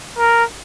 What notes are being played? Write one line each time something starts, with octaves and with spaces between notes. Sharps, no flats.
A#4